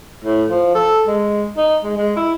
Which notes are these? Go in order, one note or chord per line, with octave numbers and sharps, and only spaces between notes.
A2
F3
A4
G#3
D#4
G#3
G#3
E4